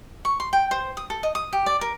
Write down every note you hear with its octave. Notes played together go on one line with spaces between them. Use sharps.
C#6
C6
G5
C5
D#6
A4
D#5
D#6
G4
D5
A#4